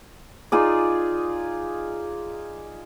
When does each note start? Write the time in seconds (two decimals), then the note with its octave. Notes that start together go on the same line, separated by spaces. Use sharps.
0.52 D#4 F4 G#4 D5